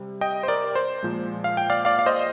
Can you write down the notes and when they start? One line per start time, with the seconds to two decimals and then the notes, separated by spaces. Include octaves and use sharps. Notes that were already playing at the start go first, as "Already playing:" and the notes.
Already playing: C3 G3
0.21 D#5 G5
0.43 C5
0.48 A#4 D5
0.75 C5
1.03 A#2 F3 G#3
1.44 F5
1.57 G5
1.70 D5 F5
1.85 D5 F5
1.99 F5
2.06 C5 D#5